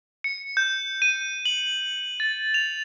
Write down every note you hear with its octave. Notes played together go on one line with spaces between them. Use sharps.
C#7
G6
D#7
F#7
A6
F7